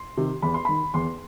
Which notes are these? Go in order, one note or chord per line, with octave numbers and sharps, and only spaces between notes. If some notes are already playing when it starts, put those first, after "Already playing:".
Already playing: C6
C3 D#3
E2 B5
C6
D#3 B5
E2 C6